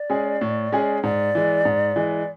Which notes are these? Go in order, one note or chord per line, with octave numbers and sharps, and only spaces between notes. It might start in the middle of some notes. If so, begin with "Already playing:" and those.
Already playing: D5
G#3 C#4 G#4
A2
G#3 C#4 G#4
G#2 D5
E3 G#3
G#2
E3 G#3